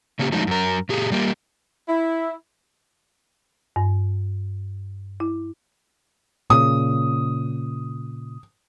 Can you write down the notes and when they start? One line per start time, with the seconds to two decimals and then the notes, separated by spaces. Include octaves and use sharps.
0.19 C#3 A#3 C#4 G4
0.32 F3 F#3 G#3 A3 D#4
0.47 F#2 A#4
0.89 A#2 G4 G#4
1.12 G3 A#3 G4
1.88 E4
3.76 G2
5.20 E4
6.50 A#2 C#3 D#6